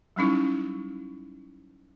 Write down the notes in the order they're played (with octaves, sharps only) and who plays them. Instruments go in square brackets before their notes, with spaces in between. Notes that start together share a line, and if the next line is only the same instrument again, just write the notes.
[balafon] F#3 G3 C#4 D#4 E4